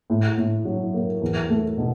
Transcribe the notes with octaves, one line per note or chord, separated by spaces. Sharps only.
A2
A2
F#3
A#3
E2
A3
B2